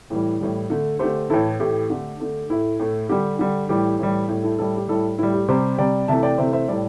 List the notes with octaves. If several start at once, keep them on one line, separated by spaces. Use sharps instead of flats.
A2 E3 G3
A2 E3 G3
D3 A3
D3 A3 G4 C5
A2 E3 A3 E4 A4
A2 E3 A3 G4
D3 A3
D3 A3
A2 A3 E4
A2 A3
D3 G3 G4
D3 G3
A2 E3 G3 G4
A2 E3 G3
A2 G3
E4 A4
A2 G3 E4 A4
G4
A2 G3 E4 A4
A2 G3 E4
G4
C3 G3 G4 C5
C3 G3 D5 G5
C3 E3 A3 E5 A5
D5 G5
C3 E3 A3 C5 E5
C5 E5
A2 G3 A4 D5